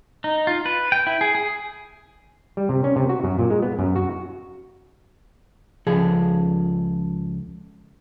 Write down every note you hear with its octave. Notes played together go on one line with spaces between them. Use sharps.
D#4
F4
B4
G5
E4
G#4
G#4
G3
C3
C#4
C3
F#4
F#2
A#2
G#3
B3
F#2
F#4
C#2 F3 G#4 A4